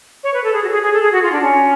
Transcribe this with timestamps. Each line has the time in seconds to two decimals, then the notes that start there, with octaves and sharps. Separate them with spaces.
0.24 C#5
0.34 B4
0.44 A4
0.53 G#4
0.64 F#4
0.69 A4
0.72 G#4
0.83 G#4
0.93 A4
1.03 G#4
1.12 F#4
1.23 F4
1.32 D4
1.42 C#4